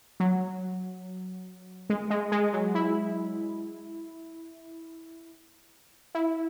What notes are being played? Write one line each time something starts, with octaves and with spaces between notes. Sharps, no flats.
F#3
G#3
G#3
G#3
F#3
E4
E4